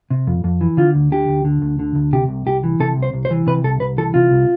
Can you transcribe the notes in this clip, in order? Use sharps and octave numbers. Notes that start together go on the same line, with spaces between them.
C3
F2
F2
E3
D3 F4
D2
D3 G4
D2
D3
D2
D3
D2
C3 G4
C2
C2 G4
E3
C3 A4
C2
C5
C2
C5
E3
C3 B4
C2 A4
C2 B4
E3 A4
C3 F4
C2